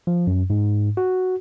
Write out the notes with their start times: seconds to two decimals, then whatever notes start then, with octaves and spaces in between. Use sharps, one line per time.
0.07 F3
0.27 F#2
0.50 G#2
0.97 F#4